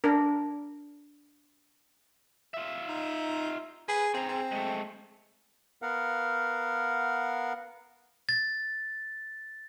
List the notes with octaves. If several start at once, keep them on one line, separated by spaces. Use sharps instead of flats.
D4 A#4
F4 E5
D#4
G#4 B4
C4 G#4 A#5
C4
G#3 A3
B3 A#4 F5 F#5
A6